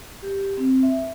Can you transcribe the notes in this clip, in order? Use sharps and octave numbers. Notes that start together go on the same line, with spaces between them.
G4
C4
E5